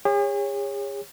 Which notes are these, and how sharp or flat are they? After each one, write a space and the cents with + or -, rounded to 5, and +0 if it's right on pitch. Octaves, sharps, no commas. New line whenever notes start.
G#4 -45 C#5 -5